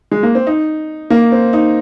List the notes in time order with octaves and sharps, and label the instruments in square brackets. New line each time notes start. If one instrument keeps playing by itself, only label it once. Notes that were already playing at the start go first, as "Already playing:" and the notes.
[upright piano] G#3
A#3
C4
D#4
A#3
C4
D#4